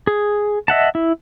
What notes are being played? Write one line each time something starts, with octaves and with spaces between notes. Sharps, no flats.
G#4
D#5 E5 F#5 A5
E4